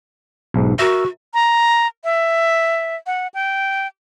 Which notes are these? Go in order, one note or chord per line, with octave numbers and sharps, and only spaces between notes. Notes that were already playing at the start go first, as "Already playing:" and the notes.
B1 G#2
F#4 A#4 E5
A#5
E5
F#5
G5